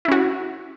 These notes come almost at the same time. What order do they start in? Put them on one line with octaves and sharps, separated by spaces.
E4 C#4 F#4